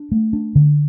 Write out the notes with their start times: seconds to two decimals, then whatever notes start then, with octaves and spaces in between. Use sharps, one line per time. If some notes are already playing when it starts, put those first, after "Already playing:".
Already playing: D4
0.12 A3
0.33 D4
0.55 D3